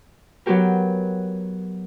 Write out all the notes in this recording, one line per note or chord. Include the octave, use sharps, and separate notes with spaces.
F#3 B3 F#4 G4 A#4